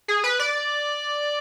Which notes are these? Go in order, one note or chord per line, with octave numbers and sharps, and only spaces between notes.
G#4
B4
D5